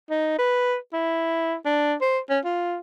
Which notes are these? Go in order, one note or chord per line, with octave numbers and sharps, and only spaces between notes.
D#4
B4
E4
D4
C5
C#4
F4